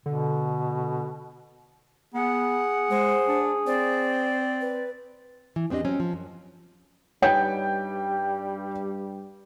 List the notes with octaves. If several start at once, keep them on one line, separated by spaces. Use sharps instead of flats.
B2 D3
B3 G#4 F#5
G#3 C5
D4
C4 C5 D5
B4
E3
E2 C4 D4 G4 D#5
F#3 C4 C#4
F3
F#2
G2 G3 D#4 B4 C#5 G5 G6